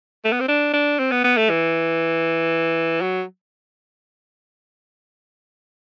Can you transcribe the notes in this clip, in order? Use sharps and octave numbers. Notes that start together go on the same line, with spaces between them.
A3
B3
C4
D4
D4
C4
B3
B3
A3
E3
F#3